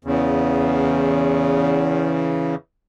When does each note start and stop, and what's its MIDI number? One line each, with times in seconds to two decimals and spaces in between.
0.05 2.55 40
0.05 2.55 49